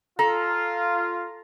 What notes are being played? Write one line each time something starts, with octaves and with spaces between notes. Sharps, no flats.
F4 A4 A#5